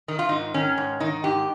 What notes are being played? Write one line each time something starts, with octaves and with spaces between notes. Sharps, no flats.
D#3 D#4
F4
G#2 D#4
D#3 C#4
G#2
D#3 D#4
G#2 G4